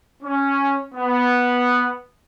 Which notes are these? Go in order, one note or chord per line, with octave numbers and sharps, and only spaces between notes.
C#4
B3